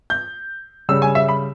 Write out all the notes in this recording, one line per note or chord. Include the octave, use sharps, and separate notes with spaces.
G6
C#3 G3 E6
G#5
E5
B5